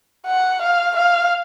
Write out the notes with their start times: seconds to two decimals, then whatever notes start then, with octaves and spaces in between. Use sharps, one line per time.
0.26 F#5
0.62 F5
0.96 F5